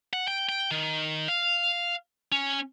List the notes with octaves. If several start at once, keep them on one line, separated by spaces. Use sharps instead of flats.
F#5
G5
G5
D#3
F5
C#4